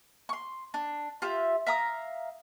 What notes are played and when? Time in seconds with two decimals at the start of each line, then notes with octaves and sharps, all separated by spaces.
0.29 C6 C#6
0.74 D4
1.22 F4 G4 E5
1.67 E5 F5 A#5 D#6